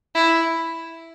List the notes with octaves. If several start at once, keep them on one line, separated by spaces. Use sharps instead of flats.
E4